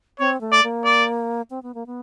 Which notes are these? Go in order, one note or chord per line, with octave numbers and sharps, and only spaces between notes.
C4 C#5
A3
D5
A#3
D5
C4
B3
A#3
B3